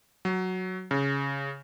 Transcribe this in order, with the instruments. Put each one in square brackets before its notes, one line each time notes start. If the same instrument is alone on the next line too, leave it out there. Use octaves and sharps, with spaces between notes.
[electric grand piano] F#3
C#3